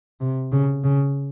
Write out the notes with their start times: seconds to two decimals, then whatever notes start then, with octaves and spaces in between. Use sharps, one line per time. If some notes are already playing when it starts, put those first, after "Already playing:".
0.20 C3
0.52 C#3
0.84 C#3